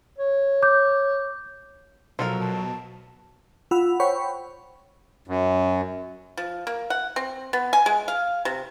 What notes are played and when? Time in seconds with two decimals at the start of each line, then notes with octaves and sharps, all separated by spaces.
0.18 C#5
0.62 D6 G6
2.19 B2 F3 F#3 A4 A#4
2.40 B2 A5
3.71 F4 F#5 B5 E6
4.00 C5 C#5 F#5 G5 B5 C#6
5.28 F#2
6.37 F3
6.67 A#3
6.90 F#5
7.16 C4
7.53 B3
7.73 G#5
7.86 G#3
8.08 F5
8.45 C3